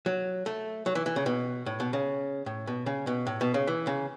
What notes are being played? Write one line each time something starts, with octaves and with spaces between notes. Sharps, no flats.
F#3
A3
F#3
E3
E3
C#3
B2
A2
B2
C#3
A2
B2
C#3
B2
A2
B2
C#3
E3
C#3